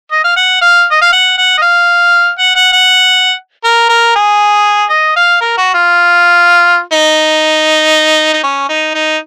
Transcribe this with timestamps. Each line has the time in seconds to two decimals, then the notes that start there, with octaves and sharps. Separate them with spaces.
0.12 D#5
0.24 F5
0.36 F#5
0.62 F5
0.91 D#5
1.02 F5
1.13 F#5
1.38 F#5
1.58 D#5
1.62 F5
2.39 F#5
2.56 F#5
2.73 F#5
3.64 A#4
3.89 A#4
4.16 G#4
4.90 D#5
5.16 F5
5.41 A#4
5.58 F#4
5.74 F4
6.93 D#4
8.33 D#4
8.43 C#4
8.69 D#4
8.95 D#4